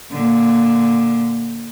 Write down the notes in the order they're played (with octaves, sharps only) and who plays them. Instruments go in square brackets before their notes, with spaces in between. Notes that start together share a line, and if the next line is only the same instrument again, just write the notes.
[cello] A#2 D3